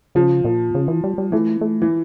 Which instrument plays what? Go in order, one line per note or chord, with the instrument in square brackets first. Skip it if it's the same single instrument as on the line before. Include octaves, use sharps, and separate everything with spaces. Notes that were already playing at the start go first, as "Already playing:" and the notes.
[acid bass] C#3 [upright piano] F3
[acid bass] A#2
C#3
E3
G3
G3
[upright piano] E3 [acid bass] A3
[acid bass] A3
[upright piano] E3